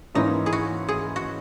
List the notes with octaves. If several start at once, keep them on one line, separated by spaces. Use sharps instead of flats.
G#2 E3 A#3 C#4 D#4 E4
G#4
F#4
G#4
F#4